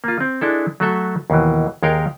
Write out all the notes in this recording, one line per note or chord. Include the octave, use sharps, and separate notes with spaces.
A#3 F4
C4
G#3 D4 E4 A4
F#3 A3 F#4 A4 E5
D#2 B2 E3
D#2 G#3 A#4 C#5 F5 G5